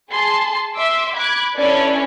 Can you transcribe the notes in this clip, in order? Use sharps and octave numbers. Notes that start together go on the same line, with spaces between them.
G#4 A5 C6
E5 C6 D6 E6
B5 D6 F#6 G#6
C#4 D4 E4 A4 B4 D5